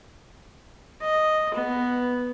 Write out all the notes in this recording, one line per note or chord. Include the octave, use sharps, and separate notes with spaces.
D#5
B3